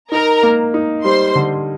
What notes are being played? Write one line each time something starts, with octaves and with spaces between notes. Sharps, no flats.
D#4 A#4 A#5
A#3
D#4
G3 C5 C6
D3